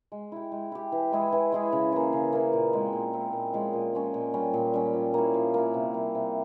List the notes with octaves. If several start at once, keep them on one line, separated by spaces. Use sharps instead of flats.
G#3
E4 G4
G#3
E4 G4
E3
G#3 E4 G#4
E3
G#3 E4 G#4
C#3
E3 A#3
C#3
E3 A#3
A#2
G#3 C4 E4
A#2
G#3 C4 E4
A#2
F3 G#3 C#4
A#2
F3 G#3 C#4
A#2
G3 C#4
A#2
G3 C#4
F3
A#3 E4
F3
A#3 E4
C3
G3 A#3
C3